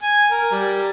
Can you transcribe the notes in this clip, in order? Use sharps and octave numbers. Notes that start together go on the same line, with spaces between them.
G#5
A#4
G3